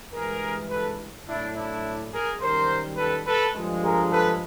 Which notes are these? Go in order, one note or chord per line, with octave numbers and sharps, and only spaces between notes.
G2 E3 G#3 G#4 A#4
A4 B4
A2 F#3 A3 D4 E4
D4 E4
G#4 A#4
F#2 D#3 G3 A#4 C5
A4 B4
A4 B4
G2 D3 F3 G#3
G#4 A#4
A4 B4